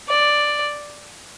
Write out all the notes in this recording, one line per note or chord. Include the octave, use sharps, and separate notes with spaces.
D5